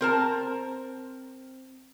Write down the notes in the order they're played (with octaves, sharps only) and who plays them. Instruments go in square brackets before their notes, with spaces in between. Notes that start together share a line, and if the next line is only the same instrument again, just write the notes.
[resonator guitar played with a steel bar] C4 A#4 A5